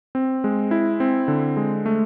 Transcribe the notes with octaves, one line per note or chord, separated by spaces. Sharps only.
C4
G#3
E4
C4
D3
G#3
A3